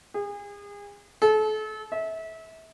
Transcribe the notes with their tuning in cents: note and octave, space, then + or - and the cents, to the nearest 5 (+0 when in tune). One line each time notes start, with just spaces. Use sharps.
G#4 -35
A4 -35
E5 -30